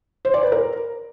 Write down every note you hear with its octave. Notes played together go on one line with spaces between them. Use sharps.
C5
D5
B4
A#4